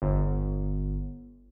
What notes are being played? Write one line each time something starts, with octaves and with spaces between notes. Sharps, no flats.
G1